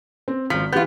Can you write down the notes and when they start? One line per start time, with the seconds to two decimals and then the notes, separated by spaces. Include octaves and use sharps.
0.28 C4
0.50 G#1 F3 B6
0.73 E3 B3 F4 G4 G6